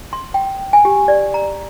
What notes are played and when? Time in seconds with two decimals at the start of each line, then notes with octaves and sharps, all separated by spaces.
0.13 C6
0.34 G5
0.73 G#5
0.85 G4
1.08 D5
1.34 A#5